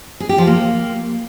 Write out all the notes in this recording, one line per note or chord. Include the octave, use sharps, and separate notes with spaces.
G#4
G4
F3
A#3